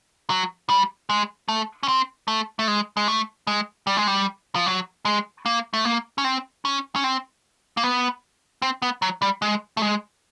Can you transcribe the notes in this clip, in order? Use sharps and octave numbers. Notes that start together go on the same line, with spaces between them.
F#3
G3
G#3
A3
C#4
C4
A3
A3
G#3
G#3
A3
G#3
G3
G#3
G3
F3
F#3
G#3
A#3
A3
A#3
C#4
C4
C#4
C#4
C4
A#3
B3
C4
B3
F#3
G3
G#3
A3
G#3